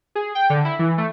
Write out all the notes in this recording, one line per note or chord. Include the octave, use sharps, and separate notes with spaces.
G#4
G5
D3
E4
E3
A3